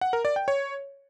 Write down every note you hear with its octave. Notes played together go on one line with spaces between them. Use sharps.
F#5
A#4
D5
G5
C#5